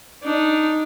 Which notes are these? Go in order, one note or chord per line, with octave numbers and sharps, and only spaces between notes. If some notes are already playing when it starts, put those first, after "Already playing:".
D4 D#4